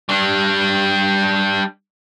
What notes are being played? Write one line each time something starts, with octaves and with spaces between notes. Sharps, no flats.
G3 D4